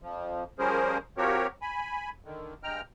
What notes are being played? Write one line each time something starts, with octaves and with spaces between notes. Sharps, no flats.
F2 F3
F3 G3 C#4 G#4 A#4 C5
F3 C4 F#4 G4 A#4 C#5
G#5 B5
D3 D#3
G2 G#3 G5 A#5 F6